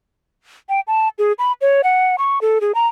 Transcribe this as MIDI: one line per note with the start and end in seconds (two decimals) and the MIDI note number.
0.69 0.80 79
0.87 1.09 81
1.18 1.33 68
1.39 1.52 83
1.61 1.82 73
1.84 2.16 78
2.18 2.39 85
2.42 2.59 69
2.61 2.72 68
2.75 2.87 82